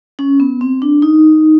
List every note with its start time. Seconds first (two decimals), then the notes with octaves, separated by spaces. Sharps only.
0.19 C#4
0.40 B3
0.61 C4
0.82 D4
1.02 D#4